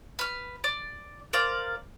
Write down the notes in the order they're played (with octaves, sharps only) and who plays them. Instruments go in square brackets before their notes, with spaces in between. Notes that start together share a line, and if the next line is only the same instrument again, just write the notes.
[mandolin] B4 F6
D5
A#4 C5 D5 F5